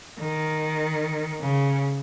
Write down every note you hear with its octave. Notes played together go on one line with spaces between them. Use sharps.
D#3
C#3